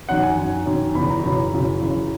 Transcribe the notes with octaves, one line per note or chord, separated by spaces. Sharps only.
F#2 D#3 F#5
G#5
F#2 D#3
F#2 D#3
E2 C#3 E3 B5
A#5
F#2 C#3 E3 B5
F#2 C#3 E3
F#2 C#3 E3